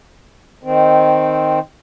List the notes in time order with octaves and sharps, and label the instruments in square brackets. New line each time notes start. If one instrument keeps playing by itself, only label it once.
[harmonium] D#3 C4